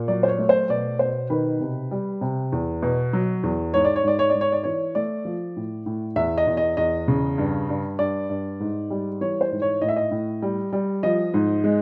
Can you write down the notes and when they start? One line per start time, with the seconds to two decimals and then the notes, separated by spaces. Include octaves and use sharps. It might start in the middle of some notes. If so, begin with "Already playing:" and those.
Already playing: A#2
0.08 F#3 D5
0.23 C5
0.28 C#5
0.39 A3
0.49 C5
0.69 B2 D5
0.99 B2 C5
1.30 D#3 B4
1.61 C3
1.91 G3
2.21 C3
2.52 E2
2.83 B2
3.13 F#3
3.43 E2
3.74 G#2 C#5
3.85 D5
3.96 C#5
4.03 G#2 D5
4.19 C#5
4.30 G#2 D5
4.41 C#5
4.52 D5
4.64 E3 C#5
4.95 A3 D5
5.25 F3
5.56 A2
5.86 A2
6.16 E2 E5
6.38 D#5
6.47 E2
6.57 D#5
6.77 E2 D#5
7.08 C#3
7.38 G2
7.69 G2
7.99 G2 D5
8.30 G2
8.60 G#2
8.91 G3
9.21 E3 C#5
9.41 C5
9.51 G#2
9.62 C#5
9.82 A2 D#5
9.88 E5
9.96 D#5
10.11 A2
10.42 G3
10.73 G3
11.03 F3 D#5
11.34 G#2
11.64 G#3